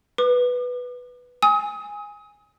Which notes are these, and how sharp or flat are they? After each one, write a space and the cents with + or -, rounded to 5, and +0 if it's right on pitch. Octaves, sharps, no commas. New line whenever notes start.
B4 +0 D6 +45
G#5 -10 D#6 +35